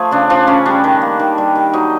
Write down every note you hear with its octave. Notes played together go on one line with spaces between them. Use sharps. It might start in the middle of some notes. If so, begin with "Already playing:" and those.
Already playing: F3 A3 G#4
C#3 D4
F3 D4
C#3 C#4
G3 D4
D#3
A#3
D#3
G3
D#3
F#3 D#4